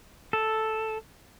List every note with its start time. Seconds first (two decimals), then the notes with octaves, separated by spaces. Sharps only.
0.33 A4